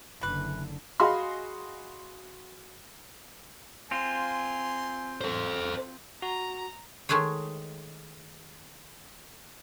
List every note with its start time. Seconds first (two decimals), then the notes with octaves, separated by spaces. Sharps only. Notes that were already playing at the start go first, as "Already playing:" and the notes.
0.21 F#1 D3 E3 B4
1.00 F#4 G#4 D#5 F5 B5 C6
3.91 C4 F4 G#5 C6
5.21 A4 C5
6.22 F#4 A#5
7.09 D#3 G#3 A3 G#4 C#5